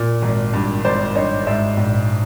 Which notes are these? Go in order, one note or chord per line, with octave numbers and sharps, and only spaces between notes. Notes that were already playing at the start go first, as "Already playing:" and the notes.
Already playing: A#2
G#1
G2
G#1 C5 D5
G2 C#5 D#5
G#2 D5 E5
A#1